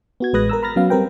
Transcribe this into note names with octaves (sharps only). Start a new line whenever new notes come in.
B3 F#4 G#6
A1 G#3 B4 D#6 F#6 A#6
A#4 A#5 E6
A#5 B5 F6 A6 A#6
F#3 B3 C#4 F5
G3 C4 A#4 B4 G5